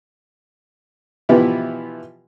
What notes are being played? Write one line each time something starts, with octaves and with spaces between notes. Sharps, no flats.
B2 E3 F3 B3 E4 G4